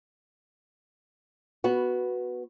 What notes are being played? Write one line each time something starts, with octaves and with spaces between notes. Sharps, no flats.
B3 F#4